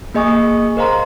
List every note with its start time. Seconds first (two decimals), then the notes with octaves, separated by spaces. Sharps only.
0.14 A#3 G#4 D#5 G#5 C#6 D#6
0.77 A#4 C5 D#5 F5 A#5 C6